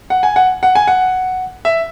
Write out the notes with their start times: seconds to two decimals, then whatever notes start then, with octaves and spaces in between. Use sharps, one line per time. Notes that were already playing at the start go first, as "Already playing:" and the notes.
0.10 F#5
0.23 G#5
0.36 F#5
0.63 F#5
0.75 G#5
0.87 F#5
1.65 E5